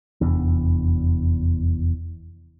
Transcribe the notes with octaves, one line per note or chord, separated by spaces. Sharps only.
F1 E2 D4